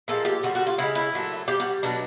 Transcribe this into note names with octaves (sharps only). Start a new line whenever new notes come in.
A#2 F3 G#3 A4
G4
D3 G3 F#4
F#4
F4
C#3 E3 G#3 E4
E4
A#2 F#3 A3
D3 G4
G3
F#4
B2 F#3 A3 D4